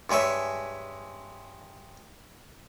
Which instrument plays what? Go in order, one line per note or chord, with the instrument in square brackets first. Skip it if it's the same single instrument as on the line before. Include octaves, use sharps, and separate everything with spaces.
[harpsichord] G2 G#3 G#4 C#5 E5